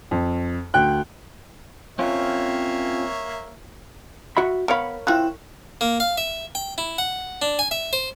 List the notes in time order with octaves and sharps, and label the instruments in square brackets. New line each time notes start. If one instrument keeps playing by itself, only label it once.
[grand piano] F2
D2 G5 F#6
[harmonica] A#3 C#5 E5 [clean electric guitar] C4 C#4 F4
[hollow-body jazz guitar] F#4 E5 B5
[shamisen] B3 F5 [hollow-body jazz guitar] A#4 C#5 B5
[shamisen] F3 C4 F4 [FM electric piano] E4 G5 F#6
[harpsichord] A#3
F5
E5
G5
E4
F#5
D4
G#5
E5
C5